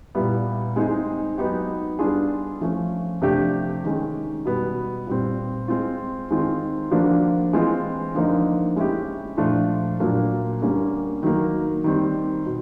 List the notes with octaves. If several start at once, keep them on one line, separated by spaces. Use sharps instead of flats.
A#2 G3 B3 E4
G#3 C4 D#4 G#4
F#3 B3 D#4 G4
G3 B3 D4 F4 G#4
F3 A3 C#4
C3 F3 A3 D4 G4
D#3 G#3 C#4
B2 G3 B3
A#2 G3 C4
G#3 C4 F4
D#3 G#3 C4 F4
D3 F3 A#3 D4 F#4
E3 G#3 C4 F4
D3 F3 A#3 D#4
G#3 C#4 E4 G4
A#2 F3 A3 D4 F4
A#2 F#3 A#3 D4
D3 G3 A#3 C#4
D#3 F#3 A#3
D#3 G3 C4
B2